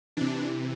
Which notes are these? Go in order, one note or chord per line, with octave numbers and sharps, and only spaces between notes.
C3 E3 D4